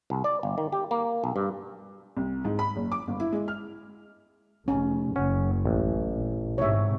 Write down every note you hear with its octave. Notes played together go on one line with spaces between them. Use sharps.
C2
D5
G1
D#3
G4
A#3
B1
G2
C2
G#2
B5
F#1
D6
G1
E4
G#3
F6
F1 C#4
F#1 C#4 F#5
A1
A#1
G#2 C3 C#5 E5